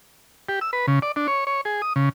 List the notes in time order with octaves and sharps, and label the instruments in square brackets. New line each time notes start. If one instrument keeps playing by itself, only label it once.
[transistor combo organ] G4
E6
B4
C#3
D5
D4
C#5
C#5
G#4
D#6
C#3